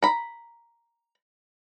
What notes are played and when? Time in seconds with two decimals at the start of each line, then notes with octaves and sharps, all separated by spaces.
0.03 A#5 B5